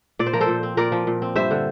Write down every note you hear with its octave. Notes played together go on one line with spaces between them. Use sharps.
A#2 D5
C5
F3 A#4
A4 C5
A#2
C4
A#2 A#4 D5
F3
A#2
C4
G2 C5 E5
D3